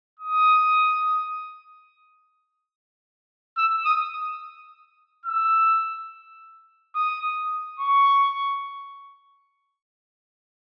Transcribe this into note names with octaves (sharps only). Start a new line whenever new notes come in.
D#6
E6
D#6
E6
D#6
C#6